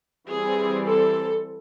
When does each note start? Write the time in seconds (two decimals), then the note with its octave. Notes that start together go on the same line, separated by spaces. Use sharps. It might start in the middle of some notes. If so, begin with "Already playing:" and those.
0.29 E3 G3 C4 G#4
0.87 A4